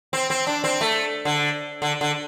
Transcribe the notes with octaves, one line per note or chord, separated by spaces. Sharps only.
C4
C4
D4
C4
A3
D3
D3
D3